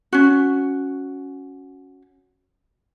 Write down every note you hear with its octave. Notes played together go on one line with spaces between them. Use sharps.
C#4 F#4